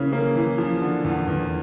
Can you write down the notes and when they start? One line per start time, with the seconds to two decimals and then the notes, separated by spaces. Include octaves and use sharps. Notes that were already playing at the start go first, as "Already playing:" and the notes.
Already playing: C#3 E3 A#3 C#4
0.13 A#3
0.36 E3
0.58 F3
0.82 D3
1.04 E2
1.27 E2